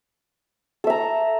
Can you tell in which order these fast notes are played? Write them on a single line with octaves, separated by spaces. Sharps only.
A4 E5 A#5